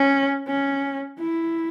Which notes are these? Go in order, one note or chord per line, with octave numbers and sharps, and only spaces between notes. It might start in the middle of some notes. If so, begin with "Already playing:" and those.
Already playing: C#4
C#4
E4